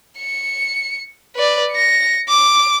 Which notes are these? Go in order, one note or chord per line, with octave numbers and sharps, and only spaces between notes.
C#7
B4 D5
A#6 C#7
D6